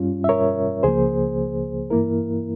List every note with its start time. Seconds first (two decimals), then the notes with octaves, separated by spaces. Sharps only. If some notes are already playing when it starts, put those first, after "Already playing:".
Already playing: G2 G3 C#4 F4
0.24 E5
0.29 A#4 C#5
0.83 C#2 C#3 F3 A#3 G#4 C5
1.90 G2 E3 A#3 E4 A#4